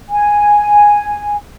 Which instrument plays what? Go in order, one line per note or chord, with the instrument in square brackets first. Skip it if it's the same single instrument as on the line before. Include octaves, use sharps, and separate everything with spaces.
[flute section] G#5